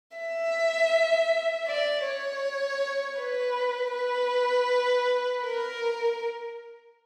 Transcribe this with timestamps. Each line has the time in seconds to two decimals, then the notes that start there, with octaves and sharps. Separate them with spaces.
0.17 E5
1.68 D5
2.06 C#5
3.19 B4
3.94 B4
5.45 A#4